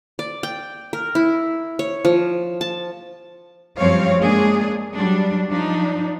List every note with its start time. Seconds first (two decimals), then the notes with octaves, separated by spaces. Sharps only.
0.19 D5
0.43 G5
0.93 A#4
1.15 E4
1.79 C#5
2.05 F3
2.61 A5
3.78 F#2 F3 G3 C4 C#5 F5
4.18 G#3 A#3 D4 G#4
4.96 F#3 G3 D4
5.49 F3 D4 D#4